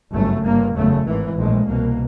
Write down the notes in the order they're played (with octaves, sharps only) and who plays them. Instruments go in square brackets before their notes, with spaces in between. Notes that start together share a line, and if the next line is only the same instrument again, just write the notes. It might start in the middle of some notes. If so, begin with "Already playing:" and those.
[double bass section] G1 F#2 C#3 A3
G1 G2 A#3
F#1 E2 C#3 A3
G#1 G#2 E3
A#1 A2 G#3
C2 B2 A#3